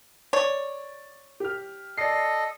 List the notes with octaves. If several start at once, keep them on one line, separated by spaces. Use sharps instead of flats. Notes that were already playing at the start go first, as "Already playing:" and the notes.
C#5 D5
G4 F6
A4 D5 D#5 C7